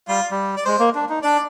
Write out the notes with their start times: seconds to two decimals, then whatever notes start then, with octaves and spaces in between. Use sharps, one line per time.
0.09 G3 F4
0.31 G3
0.57 D5
0.65 G#3 C5
0.80 A#3
0.95 D4
1.09 D#4
1.23 D4 D5